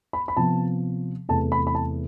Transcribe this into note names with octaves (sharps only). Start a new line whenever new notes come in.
B5
B5
C3 F3 B3 A5
E2 C3 E3 A3 A5
B5
B5
A5